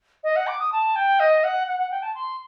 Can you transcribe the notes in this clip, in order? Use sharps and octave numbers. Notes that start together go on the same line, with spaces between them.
D#5
F#5
D6
D#6
A5
G5
D#5
F#5
F#5
F#5
G5
A5
C6